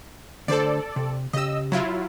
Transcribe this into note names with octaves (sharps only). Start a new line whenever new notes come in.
D2 D3 A4 C5 D5
C3
C#3 G4 D#5 E6
F#3 E4 F4